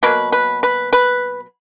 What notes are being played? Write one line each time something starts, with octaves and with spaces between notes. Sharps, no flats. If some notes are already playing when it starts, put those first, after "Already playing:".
B2 F#3 A#3 B4
B4
B4
B4